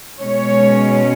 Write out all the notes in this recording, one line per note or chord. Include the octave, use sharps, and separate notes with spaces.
B2 G#3 C#4 C#5